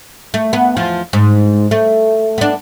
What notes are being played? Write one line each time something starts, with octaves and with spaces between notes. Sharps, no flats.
A3
B3
E2 F3
G#2
A3
B3 D4